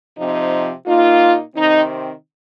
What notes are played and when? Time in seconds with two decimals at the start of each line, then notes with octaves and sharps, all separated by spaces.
0.18 C3 F3 C4 D#4
0.87 A#2 A#3 D#4 F4
1.56 C3 D#3 C4 D#4